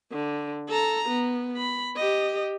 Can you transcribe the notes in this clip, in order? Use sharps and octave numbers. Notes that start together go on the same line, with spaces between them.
D3
A4 A#5
B3
B5
G4 D#5